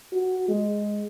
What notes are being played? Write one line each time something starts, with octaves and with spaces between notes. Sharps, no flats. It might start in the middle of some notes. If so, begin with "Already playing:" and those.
F#4
G#3